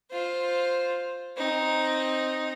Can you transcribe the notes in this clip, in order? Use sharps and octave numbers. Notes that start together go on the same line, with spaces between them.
F4 C5
C4 D#4